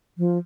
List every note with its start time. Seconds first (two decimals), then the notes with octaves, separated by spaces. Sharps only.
0.18 F3